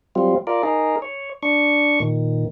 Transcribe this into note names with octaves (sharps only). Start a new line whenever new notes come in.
F#3 G3 C4 F4
F4 A#4 D5
D#4 G#4 A#4
C#5
D4 C#6
A#2 D#3